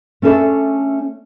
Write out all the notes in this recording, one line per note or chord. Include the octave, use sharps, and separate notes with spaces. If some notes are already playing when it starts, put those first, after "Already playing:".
A3 C#4 D4 A4 E5